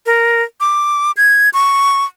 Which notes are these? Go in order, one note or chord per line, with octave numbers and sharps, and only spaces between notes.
A#4
D6
G#6
C#6